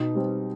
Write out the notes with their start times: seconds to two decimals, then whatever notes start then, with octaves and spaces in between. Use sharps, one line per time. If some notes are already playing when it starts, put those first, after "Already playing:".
Already playing: B2 D#4
0.15 G3 C4